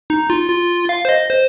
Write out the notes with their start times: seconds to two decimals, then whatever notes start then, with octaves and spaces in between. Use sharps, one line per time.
0.10 D#4
0.30 F4
0.49 F4
0.89 F5
1.05 C5
1.09 D#5
1.29 C5